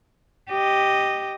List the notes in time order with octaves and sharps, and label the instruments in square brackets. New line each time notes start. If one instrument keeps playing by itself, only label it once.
[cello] G4 D#5